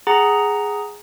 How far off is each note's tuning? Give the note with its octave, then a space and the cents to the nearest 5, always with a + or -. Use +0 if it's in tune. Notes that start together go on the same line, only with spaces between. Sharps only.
G#4 +0 F#5 +15 A#5 +0